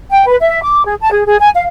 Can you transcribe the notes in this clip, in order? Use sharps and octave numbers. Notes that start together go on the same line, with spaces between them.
G5
B4
E5
D6
G#4
A5
G#4
G#4
G#5
F5